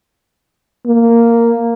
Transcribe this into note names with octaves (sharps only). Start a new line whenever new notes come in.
A#3